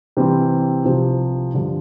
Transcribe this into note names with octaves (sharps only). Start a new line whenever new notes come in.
C3 E3 G3 C4
C2 C3 F3
G2 D3 F3